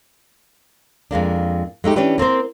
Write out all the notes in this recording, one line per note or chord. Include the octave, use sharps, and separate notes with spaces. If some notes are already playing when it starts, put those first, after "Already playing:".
F2 G#3 A#3 D4
G#3 A3 D#4 G4
E3 C#4 D4 G4 B4
A#3 C4 A#4 C5